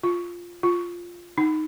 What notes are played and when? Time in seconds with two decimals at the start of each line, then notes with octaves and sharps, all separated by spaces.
0.03 F4
0.63 F4
1.38 D#4